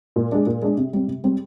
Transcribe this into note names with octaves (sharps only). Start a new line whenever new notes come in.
A#2
G#3 D4
A#2
G#3 D4
C3
G3 C4
C3
G3 C4